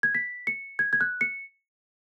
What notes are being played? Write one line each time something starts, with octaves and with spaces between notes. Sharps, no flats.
G#6
B6
C#7
G#6
G#6
F#6
C#7